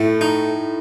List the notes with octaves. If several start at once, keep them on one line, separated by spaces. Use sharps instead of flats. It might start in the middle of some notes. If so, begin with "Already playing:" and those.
Already playing: A2 A3
D#4